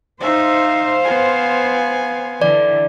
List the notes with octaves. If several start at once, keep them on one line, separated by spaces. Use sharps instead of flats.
D#4 C5 E5 F5
B3 G#5
D3 E3 D5